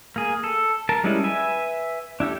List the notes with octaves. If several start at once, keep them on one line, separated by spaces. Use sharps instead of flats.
A#3 G#4
A4
A#4 A5
G3 G#3 C#4 E4
B4 E5 G#5
D4 E4 G4 A4